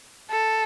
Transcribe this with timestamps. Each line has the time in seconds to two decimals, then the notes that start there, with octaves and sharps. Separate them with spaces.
0.30 A4